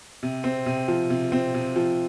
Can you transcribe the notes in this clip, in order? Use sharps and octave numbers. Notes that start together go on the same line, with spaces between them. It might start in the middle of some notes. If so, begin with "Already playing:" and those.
C3
C4
C3
F3
C3
C4
C3
F3